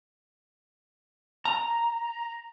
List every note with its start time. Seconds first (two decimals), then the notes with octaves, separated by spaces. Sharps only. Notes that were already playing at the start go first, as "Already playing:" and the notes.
1.45 A#5